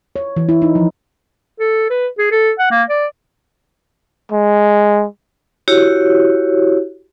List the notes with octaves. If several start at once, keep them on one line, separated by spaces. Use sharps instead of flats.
C#5
E3
E4
D#4
F3
A4
B4
G#4
A4
F#5
A#3
D5
G#3
E4 F#4 G4 C#5